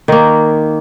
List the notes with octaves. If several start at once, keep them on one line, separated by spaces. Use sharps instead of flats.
D#3 A#3